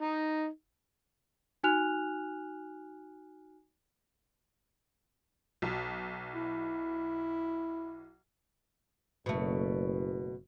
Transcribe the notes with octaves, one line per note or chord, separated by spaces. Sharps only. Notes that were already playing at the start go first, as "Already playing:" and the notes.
D#4
D#4 F#4 G#5 F6 F#6 F7
B1
E4
F#1 B2 A3